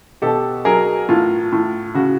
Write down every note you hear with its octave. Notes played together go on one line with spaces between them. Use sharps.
B2 G4 A4
F#3 G#4 A#4
A2 F4
A2
C#3 F#4